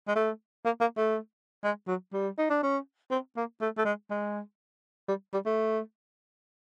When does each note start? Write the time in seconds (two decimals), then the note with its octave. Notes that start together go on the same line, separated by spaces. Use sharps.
0.08 G#3
0.16 A3
0.65 A#3
0.81 A#3
0.97 A3
1.64 G#3
1.88 F#3
2.13 G3
2.38 D#4
2.50 D4
2.63 C#4
3.11 C4
3.37 A#3
3.61 A3
3.78 A3
3.85 G#3
4.10 G#3
5.08 G3
5.33 G3
5.46 A3